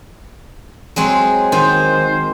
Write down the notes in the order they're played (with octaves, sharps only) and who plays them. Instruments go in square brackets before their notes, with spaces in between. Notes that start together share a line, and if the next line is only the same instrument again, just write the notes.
[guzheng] F#3 G#3 C4
[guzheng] D#3 [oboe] C5